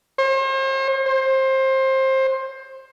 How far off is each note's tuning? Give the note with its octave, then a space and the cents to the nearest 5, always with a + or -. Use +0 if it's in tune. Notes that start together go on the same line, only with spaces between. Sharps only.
C5 +40
C5 +20